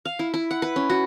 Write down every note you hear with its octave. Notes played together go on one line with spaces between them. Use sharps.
F5
E4
E4
F#5
B4
C#4
F#4